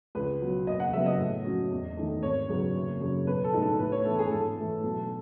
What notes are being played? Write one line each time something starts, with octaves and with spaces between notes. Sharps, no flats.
C#2 B4
B2 F#3
F#1 D#5
F#5
F#2 C#3 G#3 B3 E5
D#5
A2
F#3 C#4
E2
D#3 A3
G#1 C#5
F#2 C#3 G#3 B3
F#1
F#2 C#3
B1 B4
A4
A2 G#3 D#4
A4
A2 B4
C#5
E3 B3 E4 A4
G#4
G#2 A4
E3 A3
B1